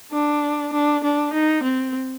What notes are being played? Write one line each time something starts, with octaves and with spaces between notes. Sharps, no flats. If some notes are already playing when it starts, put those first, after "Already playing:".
D4
D4
D4
D#4
C4